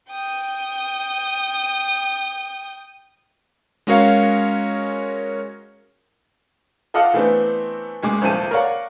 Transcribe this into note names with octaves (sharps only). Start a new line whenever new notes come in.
G5 D#6
G#3 C#4 F#4 A#4 C#5 F5
F4 A4 D#5 F5 F#5 D6
E3 A3 B3 C4 D4
F#1 G#3 D6
D#1 C2 F3 C4 A5 D#7
A#4 C#5 D5 F5 F#5